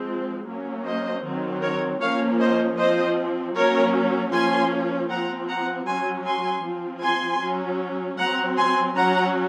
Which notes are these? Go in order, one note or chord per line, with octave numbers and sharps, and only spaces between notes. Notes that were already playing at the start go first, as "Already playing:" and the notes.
Already playing: F3 G#3 C4
F#3 A#3 C#4
C5 D#5
D#3 F#3 C4
A#4 C#5
F3 A#3 C#4 C#5 F5
C5 D#5
F3 C4 C5 D#5
F#3 A#3 C#4 A#4 C#5
F3 A#3 C#4 G#5 C6
F3 C4 F#5 A#5
F#5 A#5
F#3 C#4 G#5 C6
G#5 C6
F3 C4
G#5 C6
F#3 C#4
F#3 C4 F#5 A#5
G#5 C6
F#3 C#4 F#5 A#5